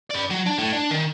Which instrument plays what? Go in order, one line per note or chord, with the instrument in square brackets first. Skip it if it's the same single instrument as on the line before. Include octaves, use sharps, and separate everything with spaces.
[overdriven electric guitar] B4 D5
F#3
D4
A2
D4
D#3